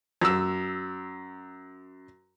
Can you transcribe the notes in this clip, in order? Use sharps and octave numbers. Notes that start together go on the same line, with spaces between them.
F#2 E6